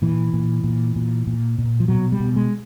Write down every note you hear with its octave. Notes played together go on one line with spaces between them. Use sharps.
A#2 E3
A#2
A#2
A#2
A#2
A#2
F3
B2 F#3
G3
B2
G#3